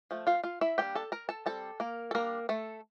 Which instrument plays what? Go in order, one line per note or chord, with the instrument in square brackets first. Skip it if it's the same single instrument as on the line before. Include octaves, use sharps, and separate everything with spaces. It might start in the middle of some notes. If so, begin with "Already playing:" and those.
[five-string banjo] F3 A3
F4 F5
F4 F5
E4 E5
G3 A#3 D4 G4 G5
A4 A5
A#4 A#5
A4 A5
G3 C4 A4 A5
A#3 A#4
A4
G3 A#3 D4 A#4
A3 A4